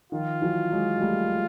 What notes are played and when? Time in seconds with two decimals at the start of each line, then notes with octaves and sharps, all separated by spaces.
0.12 D#3 F3 F4
0.42 E3 F#3
0.72 F#3 G#3
0.97 G#3
1.01 G3 A3